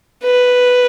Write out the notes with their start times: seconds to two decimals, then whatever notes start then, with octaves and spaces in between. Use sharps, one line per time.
0.24 B4